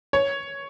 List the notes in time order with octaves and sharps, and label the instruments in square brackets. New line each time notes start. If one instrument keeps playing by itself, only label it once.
[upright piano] C#5